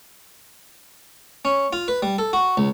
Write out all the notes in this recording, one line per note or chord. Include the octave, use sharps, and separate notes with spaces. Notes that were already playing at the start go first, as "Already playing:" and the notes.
C#4
F4
B4
G3
A4
F#4
C#2